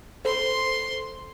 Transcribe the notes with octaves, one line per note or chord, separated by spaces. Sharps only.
A4 C5 C6